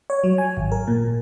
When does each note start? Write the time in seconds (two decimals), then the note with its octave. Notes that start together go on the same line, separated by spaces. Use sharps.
0.10 C#5
0.24 F#3
0.38 G#5
0.57 G#1
0.72 A#4
0.88 A#2